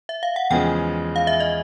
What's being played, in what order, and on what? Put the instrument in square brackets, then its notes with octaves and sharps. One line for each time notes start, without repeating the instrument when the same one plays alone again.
[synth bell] E5
F5
F#5
[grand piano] E2 C#3 F3 G#3 [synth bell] G5
[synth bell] F5
E5
D#5